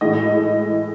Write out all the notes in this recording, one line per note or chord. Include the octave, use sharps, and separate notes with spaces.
A2 E3 G#3 D#5